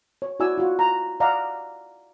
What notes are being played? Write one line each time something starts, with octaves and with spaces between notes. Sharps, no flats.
C#5
E4 F#4 D5 G#5 E6
F4 F#4
A#5
D5 D#5 F5 F#5 A#5